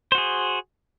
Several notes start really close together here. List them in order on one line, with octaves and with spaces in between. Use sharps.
C5 F#4 G#4